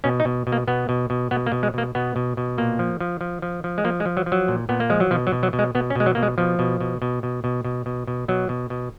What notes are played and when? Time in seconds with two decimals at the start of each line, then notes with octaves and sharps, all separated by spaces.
0.04 B2 C#4
0.20 D#4
0.25 B2
0.47 B2
0.52 A#3
0.67 B2 B3
0.89 B2
1.10 B2
1.31 B2 B3
1.46 A#3
1.52 B2
1.63 G#3
1.74 B2 A#3
1.95 B2 B3
2.16 B2
2.37 B2
2.58 A#2 A#3
2.79 F3
3.00 F3
3.21 F3
3.42 F3
3.64 F3
3.78 G#3
3.84 F3 A#3
4.00 G#3
4.05 F3
4.17 F#3
4.26 F3
4.32 F#3
4.48 A#2
4.69 A#2 B3
4.80 A#3
4.90 F3 G#3
5.00 F#3
5.11 B2 F3
5.27 F#3
5.32 B2
5.43 F#3
5.53 B2
5.59 G#3
5.75 B2 B3
5.90 C#4
5.95 B2 G#3
6.06 F#3
6.15 B2 A#3
6.23 G#3
6.38 B2 F3
6.59 B2
6.80 B2
7.02 B2
7.23 B2
7.44 B2
7.65 B2
7.86 B2
8.07 B2
8.28 B2 F#3
8.49 B2
8.70 B2